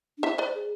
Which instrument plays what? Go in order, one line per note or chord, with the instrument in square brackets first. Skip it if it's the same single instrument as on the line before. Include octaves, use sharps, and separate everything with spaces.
[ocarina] D4
[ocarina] E4 [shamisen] C5 E5
[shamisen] B4 D5 [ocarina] C5
[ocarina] G#4